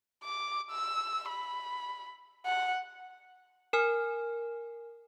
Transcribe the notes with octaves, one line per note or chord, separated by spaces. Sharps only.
D6
E6
B5
F#5
A#4 G#5 F6